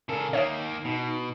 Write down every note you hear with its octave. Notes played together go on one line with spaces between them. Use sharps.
C#3 A4 A#4
D#3 A#3 D#4 C#5 E5 D#6
B2